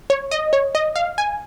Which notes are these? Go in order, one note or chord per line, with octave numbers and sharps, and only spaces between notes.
C#5
D#5
C#5
D#5
F5
G#5